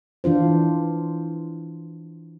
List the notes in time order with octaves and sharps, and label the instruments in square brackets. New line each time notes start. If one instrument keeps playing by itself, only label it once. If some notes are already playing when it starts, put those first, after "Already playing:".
[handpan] E3 D4 F4 C5